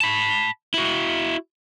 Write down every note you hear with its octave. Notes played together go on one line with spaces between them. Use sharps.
A5 B5
E4 F#4